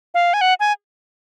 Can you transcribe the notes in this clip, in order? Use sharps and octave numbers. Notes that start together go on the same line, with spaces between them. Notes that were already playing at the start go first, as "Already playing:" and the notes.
F5
G#5
F#5
G#5